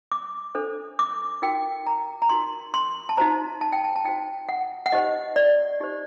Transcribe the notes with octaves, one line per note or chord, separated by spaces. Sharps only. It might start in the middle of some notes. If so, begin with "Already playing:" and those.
D6
D4 A4 C5
D6
D#4 F#4 A#4 G5
A#5
A#5
D#4 F#4 A#4 C6
C6
A5
D#4 F#4 C5 A#5
A5
G5
A5
A5
D#4 F#4 C5 G5
F#5
F#5
D#4 G4 C5 D#5
D5
D#4 G4 C5